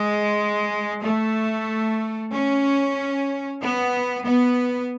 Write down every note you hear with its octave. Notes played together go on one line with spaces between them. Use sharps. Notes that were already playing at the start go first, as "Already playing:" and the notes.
Already playing: G#3
A3
C#4
B3
B3